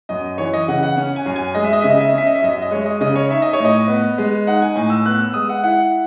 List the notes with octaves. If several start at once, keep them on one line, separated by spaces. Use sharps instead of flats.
F#2 D#5
E3 C#5
D#5
C#3 F#5
F#5
C#4
G#5
F#2
G#5
G#3 D#5
E5
D#5
C#3 E5
D#5
E5
D#5
C#4 E5
D#5
E5
F#2 D#5
E5
D#5
G#3 C#5
D#5
C#3 D#5
C#5
D#4 E5
D#5
C#5
A2
D#5
B3
G#3
D#4 F#5
G#5
A2 G#5
E6
B3 F#6
E6
G#3 D#6
F#5
E4 F#5